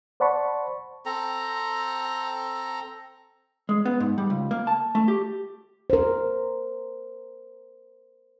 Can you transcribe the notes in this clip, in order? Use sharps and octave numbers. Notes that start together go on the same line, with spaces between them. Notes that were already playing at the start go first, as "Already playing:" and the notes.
C5 D5 F#5 A5 B5 C#6
C4 A4 A#5
G#3
B3
G#2
G3
C#2
A#3
A5
A3
G4
A#4 C5